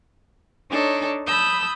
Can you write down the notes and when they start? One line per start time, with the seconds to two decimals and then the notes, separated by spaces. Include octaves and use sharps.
0.68 D4 D#4 A4 C#5
1.25 A5 B5 D#6 E6 G6